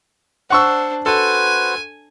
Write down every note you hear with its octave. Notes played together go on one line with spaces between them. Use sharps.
D4 C5 F#5 C#6 E6
F#4 A4 B4 C5 G#5